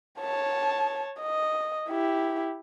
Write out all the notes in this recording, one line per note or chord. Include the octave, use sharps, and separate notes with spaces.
C#5 A5
D#5
E4 G4